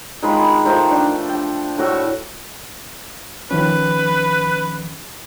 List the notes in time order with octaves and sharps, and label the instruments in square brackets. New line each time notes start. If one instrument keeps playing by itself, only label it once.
[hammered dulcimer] D#3 G#3 F4 B5
D#3 F3 A3 C5
D4 G5
G5
A2 F#4 E5 C#6
[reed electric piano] D#3 F3 C#4 [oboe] B4